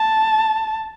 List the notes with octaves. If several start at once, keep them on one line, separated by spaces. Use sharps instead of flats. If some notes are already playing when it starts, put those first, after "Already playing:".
Already playing: A5